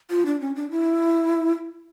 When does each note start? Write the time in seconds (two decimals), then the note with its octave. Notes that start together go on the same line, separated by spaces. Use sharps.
0.10 F4
0.26 D4
0.40 C#4
0.55 D4
0.71 E4